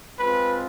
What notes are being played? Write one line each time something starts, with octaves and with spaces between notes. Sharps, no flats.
G#3 C4 F4 B4